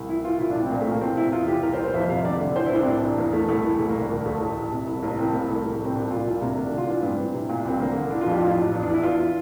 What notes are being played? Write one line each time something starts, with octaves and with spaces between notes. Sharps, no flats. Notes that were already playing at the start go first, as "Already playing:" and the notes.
Already playing: C2
E3 E4
E3 F4
C2 E4
D4
C2 C4
C4
A#2 A#3
A3
A#2
A#3
E3 C4
C3 E4
E2 F4
E3 G4
C2 A#4
C5
C2
C5
F2 E5
C3 F5
D3 D5
D3
E3 C5
E4
C2
D4
C4
A1 D4
E3
E2 A#3
E2 A3
C2 A3
E3
C2 A3
A#3
C2
D4
D2 A#3
D2 A3
A1
E3
C3
C2
A1 A#3
E3 C4
C2 A#3
C2 A3
A1
A3
A1
C4
C2 D4
A#2 F4
C2 D4
C3 A#3
D3 D4
D4
D3
F4
E3 D4
G2 C4
E3
C3
A#2
D4
C2 C4
D3 A#3
D3
E3 D4
F4
F2
G4
A1 F4
A1 D4
E2
D4
E3
E4
E2 F4